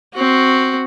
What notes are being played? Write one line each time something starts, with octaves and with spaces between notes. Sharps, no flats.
C4 F#4